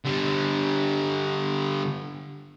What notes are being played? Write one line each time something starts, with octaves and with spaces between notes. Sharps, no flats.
D3 G3